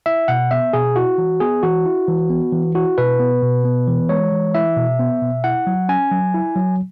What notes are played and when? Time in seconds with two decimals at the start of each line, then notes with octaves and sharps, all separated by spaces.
0.06 E4 E5
0.28 B2 F#5
0.51 B3 E5
0.73 B2 G#4
0.96 E4 F#4
1.18 E3
1.40 B3 G#4
1.63 E3 F#4
1.86 E4
2.08 E3
2.30 B3
2.52 E3
2.75 E4 F#4
2.98 B2 B4
3.20 B3
3.42 B2
3.65 B3
3.87 E3
4.09 G#3 C#5
4.32 E3
4.55 E4 E5
4.77 B2
4.99 B3
5.22 B2
5.44 E4 F#5
5.67 F#3
5.89 C#4 G#5
6.11 F#3
6.34 E4
6.56 F#3